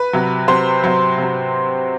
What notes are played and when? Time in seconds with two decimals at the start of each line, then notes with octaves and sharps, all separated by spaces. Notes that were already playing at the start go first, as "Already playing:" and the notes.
Already playing: B4
0.13 C3 F#3
0.48 C3 F#3 C5
0.84 C3 F#3
1.18 C3 F#3